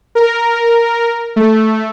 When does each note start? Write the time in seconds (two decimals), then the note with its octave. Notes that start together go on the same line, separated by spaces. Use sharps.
0.15 A#4
1.36 A3